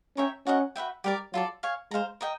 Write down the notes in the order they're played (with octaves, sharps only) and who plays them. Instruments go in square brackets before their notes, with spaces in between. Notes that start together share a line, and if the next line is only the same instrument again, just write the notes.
[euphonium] C#4 [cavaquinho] A#4 C#5 E5 G5
[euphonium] C#4 [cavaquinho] F#4 A#4 D#5 F#5
[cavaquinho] F#4 B4 E5 G5
[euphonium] G3 [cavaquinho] G4 A#4 D5
[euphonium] F#3 [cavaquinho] F4 A4 D5
[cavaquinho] C#5 F5 G#5
[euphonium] G#3 [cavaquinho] C5 F5 A#5
[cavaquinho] A#4 D#5 G5